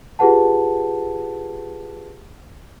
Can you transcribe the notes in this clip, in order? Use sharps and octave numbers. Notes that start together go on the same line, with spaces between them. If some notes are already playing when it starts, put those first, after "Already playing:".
F4 G4 G#4 B4 F#5 A5